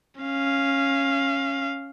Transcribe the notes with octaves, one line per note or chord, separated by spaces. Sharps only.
C#4 F5